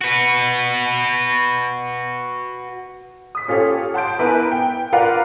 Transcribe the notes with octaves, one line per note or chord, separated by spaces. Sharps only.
F#4 B4
D#6 B6
C#4 F4 G4 A4 C#5
F#5 A5 C6 G6 D7
B3 E4 A#4 B4 G#5 B5
G5
F4 A#4 B4 D5 F5 F#5